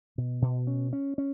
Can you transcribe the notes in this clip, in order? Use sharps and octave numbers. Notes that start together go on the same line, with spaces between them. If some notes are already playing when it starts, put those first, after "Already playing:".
B2
B2
C#4
C#4
C#4